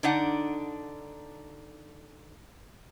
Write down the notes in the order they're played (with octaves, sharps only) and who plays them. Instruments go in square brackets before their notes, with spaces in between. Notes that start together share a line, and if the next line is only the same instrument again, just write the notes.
[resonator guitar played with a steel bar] D3 D4 D#4 F#5